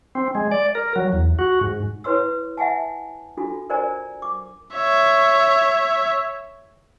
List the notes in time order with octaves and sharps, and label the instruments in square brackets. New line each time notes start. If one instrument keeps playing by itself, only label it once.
[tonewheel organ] C4
G#3
D5
A#4
F#3
E2
F#4
G#2
[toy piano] E4 B4 C#5 C6 E6
E5 F#5 G#5 A5
D4 F4 F#4 A4
A#4 C5 D5 G#5 A#5
D6
[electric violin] C#5 E5